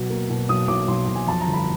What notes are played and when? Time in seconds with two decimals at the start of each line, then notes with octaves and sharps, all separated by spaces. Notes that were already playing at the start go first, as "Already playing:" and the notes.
Already playing: B2 F#3
0.10 A#3
0.30 B2
0.49 B1 D#6
0.68 B1 D6
0.88 B1 C6
1.08 B1
1.15 G#5
1.27 F2 A5
1.41 A#5
1.47 G1
1.53 B5